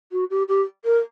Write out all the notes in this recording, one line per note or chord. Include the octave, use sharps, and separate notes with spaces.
F#4
G4
G4
A#4